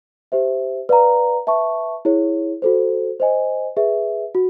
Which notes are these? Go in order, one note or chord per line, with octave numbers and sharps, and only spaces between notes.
G4 C5 E5
B4 D5 F5 A#5
B4 E5 A5 C#6
E4 G#4 C#5
F#4 A4 C5
C5 D#5 G#5
G#4 B4 E5
F#4